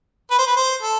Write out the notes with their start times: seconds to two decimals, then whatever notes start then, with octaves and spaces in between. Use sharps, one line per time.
0.31 B4
0.39 C5
0.47 B4
0.57 C5
0.83 A4